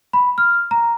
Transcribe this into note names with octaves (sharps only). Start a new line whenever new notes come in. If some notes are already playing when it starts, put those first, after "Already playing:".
B5
F6
A#5